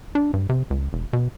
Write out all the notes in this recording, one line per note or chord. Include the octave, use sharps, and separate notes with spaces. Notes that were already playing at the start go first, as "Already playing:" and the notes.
D4
G2
C3
C#2
E1
B2